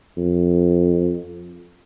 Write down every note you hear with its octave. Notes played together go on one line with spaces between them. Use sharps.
F2